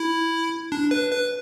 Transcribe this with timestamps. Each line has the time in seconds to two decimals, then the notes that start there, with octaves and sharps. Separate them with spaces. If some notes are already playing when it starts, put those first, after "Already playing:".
Already playing: E4
0.72 D4
0.91 B4
1.11 B4